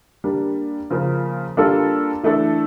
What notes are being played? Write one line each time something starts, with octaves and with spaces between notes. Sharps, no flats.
G3 A#3 D4
C#3 F3 A#3
G3 A#3 D4 F4 A4
E3 A3 D4 A4